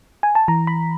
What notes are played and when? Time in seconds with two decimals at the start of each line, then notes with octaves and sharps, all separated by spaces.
0.23 G#5
0.35 A5
0.48 E3 A#5
0.67 B5